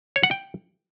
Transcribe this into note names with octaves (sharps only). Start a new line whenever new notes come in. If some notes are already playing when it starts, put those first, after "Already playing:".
C#5
F#5
G5